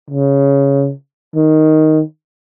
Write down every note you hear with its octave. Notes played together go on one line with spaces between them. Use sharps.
C#3
D#3